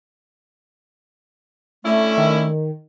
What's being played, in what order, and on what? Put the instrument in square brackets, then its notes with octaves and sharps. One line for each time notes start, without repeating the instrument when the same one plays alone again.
[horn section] D3 C#4 E4 [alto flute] A3
[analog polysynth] D#3